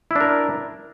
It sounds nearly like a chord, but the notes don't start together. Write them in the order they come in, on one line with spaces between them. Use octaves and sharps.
E4 D4 A#4